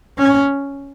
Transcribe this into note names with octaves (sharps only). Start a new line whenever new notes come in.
C#4